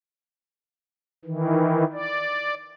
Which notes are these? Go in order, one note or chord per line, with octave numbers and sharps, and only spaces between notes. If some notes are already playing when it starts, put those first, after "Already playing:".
D#3 E3
D5